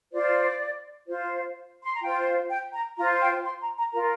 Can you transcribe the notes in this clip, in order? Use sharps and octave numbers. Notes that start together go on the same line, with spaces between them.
F4 C5 D5
F4 C5
C6
A#5
F4 C5 G5
G5
A#5
F4 C5 A#5
G5
C6
A#5
A#5
F4 A#4 A#5